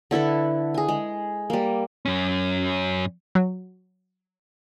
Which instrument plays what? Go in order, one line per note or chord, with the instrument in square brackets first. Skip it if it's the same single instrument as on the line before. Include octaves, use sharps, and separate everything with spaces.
[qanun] D3 E4 A4 B4
G#4 G#5
G#3
G3 A#3
[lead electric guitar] F#2 C#4
[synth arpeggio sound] F#3